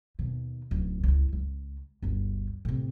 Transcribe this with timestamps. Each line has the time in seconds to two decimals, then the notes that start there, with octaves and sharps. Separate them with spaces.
0.19 D#2 B2
0.71 D1 C#2
1.04 C#2 E4
1.33 C#2
2.02 G1 D2
2.65 A2 C3